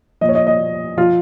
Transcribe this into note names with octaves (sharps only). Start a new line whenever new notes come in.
A#2 F3 C#5 D#5
D#5
D#5
F3 F4